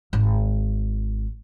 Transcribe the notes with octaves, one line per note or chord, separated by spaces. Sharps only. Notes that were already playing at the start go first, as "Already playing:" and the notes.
G#1